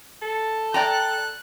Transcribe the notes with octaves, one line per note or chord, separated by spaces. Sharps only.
A4
D5 G5 A#5 F#6